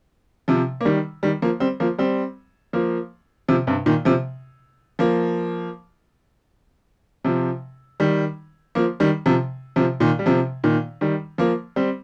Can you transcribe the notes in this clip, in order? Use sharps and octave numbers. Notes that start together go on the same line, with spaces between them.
C3 F3
A#3
D#3 G3
D#3 G3
F3 A#3
G3 C4
F3 A#3
G3 C4
F3 A#3
C3 F3
G2 C3
A#2 D#3
C3 F3
F3 A#3
C3 F3
D#3 G3
F3 A#3
D#3 G3
C3 F3
C3 F3
A#2 D#3
G3
C3 F3
A#2 D#3
D#3 G3
F3 A#3
G3 C4